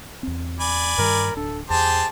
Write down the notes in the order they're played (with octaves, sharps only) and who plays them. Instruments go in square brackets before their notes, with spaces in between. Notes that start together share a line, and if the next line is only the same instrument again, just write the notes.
[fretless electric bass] E2 C4
[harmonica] D5 G#5 B5
[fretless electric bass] G2 D#3 G3 [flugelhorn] A#4
[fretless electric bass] D1 D4 [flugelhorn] A4
[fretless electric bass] E2 [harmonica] G4 G#4 C5 [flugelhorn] A5